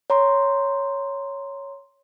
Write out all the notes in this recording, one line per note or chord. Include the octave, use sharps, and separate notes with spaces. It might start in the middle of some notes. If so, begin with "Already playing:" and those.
C#5 A#5 C6